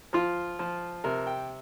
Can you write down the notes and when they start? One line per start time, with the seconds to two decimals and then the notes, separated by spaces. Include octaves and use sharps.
0.13 F3 F4
0.59 F3
1.04 C3 A#4
1.27 G5